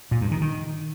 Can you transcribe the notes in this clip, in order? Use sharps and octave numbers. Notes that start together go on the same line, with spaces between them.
A#2
G2
D#3
D#3